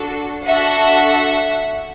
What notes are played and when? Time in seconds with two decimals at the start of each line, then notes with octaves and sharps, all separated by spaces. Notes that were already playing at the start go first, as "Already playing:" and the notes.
Already playing: D4 F#4 A4
0.47 D4 F#4 A4 E5 F#5